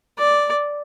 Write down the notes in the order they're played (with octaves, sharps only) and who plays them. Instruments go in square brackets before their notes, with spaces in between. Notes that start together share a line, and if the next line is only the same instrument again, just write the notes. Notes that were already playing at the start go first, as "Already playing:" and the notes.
[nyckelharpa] D5